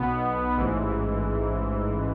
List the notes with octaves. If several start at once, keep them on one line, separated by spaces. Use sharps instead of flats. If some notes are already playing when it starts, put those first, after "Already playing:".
Already playing: B1 B2 B3
A1 G#2 E3